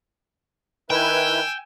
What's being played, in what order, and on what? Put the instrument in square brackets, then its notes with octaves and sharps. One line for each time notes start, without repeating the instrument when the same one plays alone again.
[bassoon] D#3 [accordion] E4 B4 [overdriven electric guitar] G5 [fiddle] G#5 E6